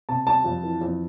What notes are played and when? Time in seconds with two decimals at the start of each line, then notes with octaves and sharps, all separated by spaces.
0.09 C3 A5
0.27 G3 A5
0.44 F2
0.63 E3
0.81 F2